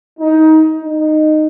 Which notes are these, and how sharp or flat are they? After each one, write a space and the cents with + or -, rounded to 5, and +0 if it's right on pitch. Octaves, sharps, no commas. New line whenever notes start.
D#4 +20
D#4 -15